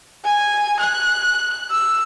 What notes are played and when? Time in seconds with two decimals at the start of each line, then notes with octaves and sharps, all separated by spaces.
0.24 G#5
0.79 F#6
1.71 E6